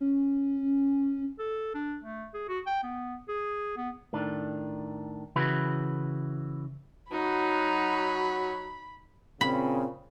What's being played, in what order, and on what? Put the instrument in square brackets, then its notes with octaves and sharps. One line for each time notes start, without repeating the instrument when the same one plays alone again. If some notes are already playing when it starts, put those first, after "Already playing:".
[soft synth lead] C#4
[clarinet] A4
D4
A3
G#4
F#4
G5
B3
G#4
B3
[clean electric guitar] A2 D#3 D4
C#3 E3 E4 F#4 B4
[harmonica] F#3 F#4 [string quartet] D#4 [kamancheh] B5
[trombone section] A#2 C#3 [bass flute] C4 [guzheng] B5